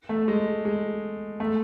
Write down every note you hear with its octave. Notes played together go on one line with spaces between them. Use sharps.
A3
G#3
G#3
A3